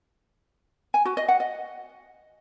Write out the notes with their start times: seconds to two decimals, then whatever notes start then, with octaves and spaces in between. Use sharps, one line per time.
0.94 G#5
1.05 F#4
1.17 D#5
1.28 F#5
1.40 D#5